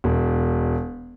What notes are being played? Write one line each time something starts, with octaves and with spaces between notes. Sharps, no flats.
E1